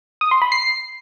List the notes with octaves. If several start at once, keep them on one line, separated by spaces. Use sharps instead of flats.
D#6
C6
B5
C7